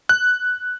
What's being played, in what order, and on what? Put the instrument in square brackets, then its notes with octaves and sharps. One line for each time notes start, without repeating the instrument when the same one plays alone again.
[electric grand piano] F#6